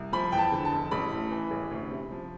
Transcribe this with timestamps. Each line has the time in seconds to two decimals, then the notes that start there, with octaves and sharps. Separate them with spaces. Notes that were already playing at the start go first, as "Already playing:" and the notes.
Already playing: C2
0.13 F3 B5
0.32 E2 G5
0.38 A5
0.51 D3
0.65 A5
0.72 F1
0.91 A1 B5
1.11 A2
1.31 E3
1.51 A1
1.71 D2
1.91 C3
2.11 F3